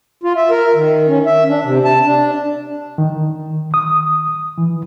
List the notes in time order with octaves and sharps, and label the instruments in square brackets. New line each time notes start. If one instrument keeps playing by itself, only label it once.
[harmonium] F4
E5
A#4
D#3
C#4
E5
D4
C3
A5
D4
[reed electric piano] D#3
D#6
E3